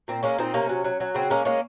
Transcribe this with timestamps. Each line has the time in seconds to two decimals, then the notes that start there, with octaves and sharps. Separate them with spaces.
0.08 A#2 C4
0.23 G#3 A#3 C#4
0.39 A#2 C4 D#4
0.54 C3 A#3 C#4
0.69 F#3
0.84 F#3
1.00 F#3
1.15 C#3 C4
1.30 G#3 A#3 C#4
1.45 G#3 A#3 C#4